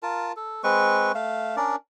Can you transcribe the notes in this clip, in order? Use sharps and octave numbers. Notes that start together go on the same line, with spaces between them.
F4 A#4 A5
A4
G#3 C4 B4 C#6
A3 F5
C#4 D4 A#4 D5